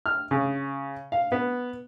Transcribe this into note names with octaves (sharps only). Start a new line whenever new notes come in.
F6
C#3
F5
B3